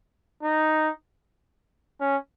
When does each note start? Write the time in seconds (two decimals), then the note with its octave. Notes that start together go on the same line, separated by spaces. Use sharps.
0.43 D#4
2.00 C#4